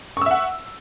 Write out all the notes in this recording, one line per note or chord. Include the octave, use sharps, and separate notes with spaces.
E5 F#5 C#6 E6